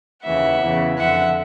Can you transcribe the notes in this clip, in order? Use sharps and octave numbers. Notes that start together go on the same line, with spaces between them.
D#2 C#3 E3 E5 F#5
E2 C#3 E3
F2 D3 E5 F#5